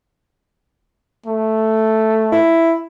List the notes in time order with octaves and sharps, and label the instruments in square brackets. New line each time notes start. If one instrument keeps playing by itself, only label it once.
[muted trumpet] A3
[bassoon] E4